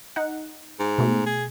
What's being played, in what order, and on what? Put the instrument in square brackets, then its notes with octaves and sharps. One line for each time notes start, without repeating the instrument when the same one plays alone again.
[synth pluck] D#4 F#5
[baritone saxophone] G#2
[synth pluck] B2 A3
[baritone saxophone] G#4